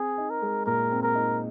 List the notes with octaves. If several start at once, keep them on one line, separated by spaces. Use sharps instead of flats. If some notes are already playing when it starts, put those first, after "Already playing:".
Already playing: C4 G#4
D#4
A#4
G#3
A#2 A#4
C4
A#4
D#4